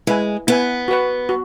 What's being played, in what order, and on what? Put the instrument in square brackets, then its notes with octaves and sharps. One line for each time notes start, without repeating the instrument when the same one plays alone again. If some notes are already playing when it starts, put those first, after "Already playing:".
[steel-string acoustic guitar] G#3 [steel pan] E4 B4 G#5
[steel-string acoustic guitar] B3 [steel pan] E4 B4 G#5
[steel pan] F#4 B4 F#5
F#4